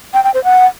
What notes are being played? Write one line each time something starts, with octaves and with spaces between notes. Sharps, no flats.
G5
G5
C5
F#5